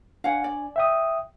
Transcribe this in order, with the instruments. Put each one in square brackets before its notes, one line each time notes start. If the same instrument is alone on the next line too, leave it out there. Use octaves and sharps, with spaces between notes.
[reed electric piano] D4 G#5 [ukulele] F5 F#5
[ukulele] D5
[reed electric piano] E5 G5 D#6